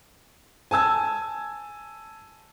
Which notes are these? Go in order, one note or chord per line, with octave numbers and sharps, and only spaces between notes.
G#5 A5 E6 G#6